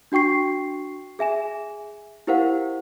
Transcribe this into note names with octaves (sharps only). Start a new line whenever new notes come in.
D4 F#4 G5 C#6 C7
G#4 E5 G#5 E7
E4 G4 A#4 C5 F5 F#5